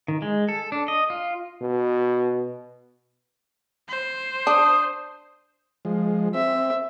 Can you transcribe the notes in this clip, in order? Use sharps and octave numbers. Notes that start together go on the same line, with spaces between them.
D#3
G#3
A4
D4
D#5
F4
B2
C5
D4 D#6
F3 G#3
C4 E5